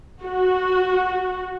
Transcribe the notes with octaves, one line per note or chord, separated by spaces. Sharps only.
F#4